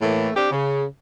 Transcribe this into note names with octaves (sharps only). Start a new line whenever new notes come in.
A2 E3 A3 A#3
C4 D4 G4
C#3